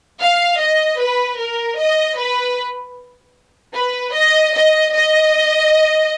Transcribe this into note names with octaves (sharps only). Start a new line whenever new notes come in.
F5
D#5
B4
A#4
D#5
B4
B4
D#5
D#5
D#5